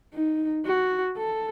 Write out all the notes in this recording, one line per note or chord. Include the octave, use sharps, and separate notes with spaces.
D#4
F#4
A4